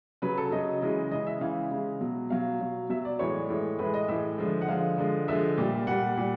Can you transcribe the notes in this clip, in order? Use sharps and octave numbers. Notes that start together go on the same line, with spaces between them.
C#3 F#3 B4
A4
C#3 F#3 D#5
C#3 E3 G#3
C#3 E3 G#3 D#5
E5
C#3 E3 G#3 F5
C#3 E3 G#3
B2 F#3
B2 F#3 F5
B2 F#3
B2 F#3 E5
D5
A2 E3 G#3 C#5
A2 E3 G#3
A2 E3 G#3 B4
D#5
A2 E3 G#3 E5
D3 F3 G#3
F#5
D3 F3 G#3 F5
D3 F3 G#3
D3 F3 G#3 E5
A#2 G3
A#2 G3 F#5
A#2 G3